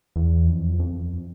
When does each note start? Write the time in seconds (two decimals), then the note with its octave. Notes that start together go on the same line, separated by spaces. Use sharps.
0.16 E2
0.47 F2
0.73 E2
0.79 F2